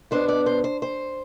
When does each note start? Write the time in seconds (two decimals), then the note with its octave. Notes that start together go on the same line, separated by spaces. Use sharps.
0.11 B2 B3 D4 C5
0.28 D5
0.46 C5
0.64 C5
0.82 C5